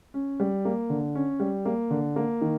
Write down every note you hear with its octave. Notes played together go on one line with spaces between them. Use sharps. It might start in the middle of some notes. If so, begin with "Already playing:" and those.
C#4
G3
A#3
D3
C#4
G3
A#3
D3
A#3
D#3